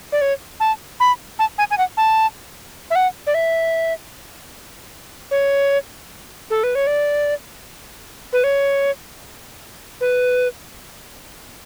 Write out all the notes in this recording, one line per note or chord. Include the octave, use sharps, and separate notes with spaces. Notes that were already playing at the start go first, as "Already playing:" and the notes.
D5
C#5
A5
B5
A5
G#5
G#5
F#5
A5
E5
F#5
D5
E5
C#5
A4
B4
C#5
D5
B4
C#5
B4